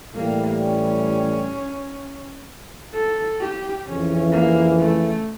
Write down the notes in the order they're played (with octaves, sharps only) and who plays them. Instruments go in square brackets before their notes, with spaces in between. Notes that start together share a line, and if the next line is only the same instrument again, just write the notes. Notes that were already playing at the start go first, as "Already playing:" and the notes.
[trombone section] A2 E3 G3 [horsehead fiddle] A#3
[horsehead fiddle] C#4
A4
G4
[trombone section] F2 C#3 E3 [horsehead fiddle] C#4
[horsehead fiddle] A#3
A3